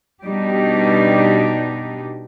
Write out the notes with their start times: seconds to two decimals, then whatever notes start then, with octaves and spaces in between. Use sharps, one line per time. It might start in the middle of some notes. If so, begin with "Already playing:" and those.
0.23 B2 G3 D4 D#4 G4